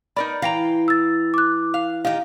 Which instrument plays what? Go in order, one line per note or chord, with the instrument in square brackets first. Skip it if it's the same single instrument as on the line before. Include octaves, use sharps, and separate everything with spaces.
[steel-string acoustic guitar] B3 [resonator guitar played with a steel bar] D#4 A#4 D5 [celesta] B5
[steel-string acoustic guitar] E3 [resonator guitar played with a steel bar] F5 G5 A#5
[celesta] E6 A6
D6 F#6
[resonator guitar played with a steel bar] F5
[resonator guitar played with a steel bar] D#3 D#4 [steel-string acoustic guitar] G4 G5 [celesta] F5